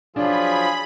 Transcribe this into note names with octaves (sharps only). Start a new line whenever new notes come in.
F3 F#3 D4 F4 G#4 B5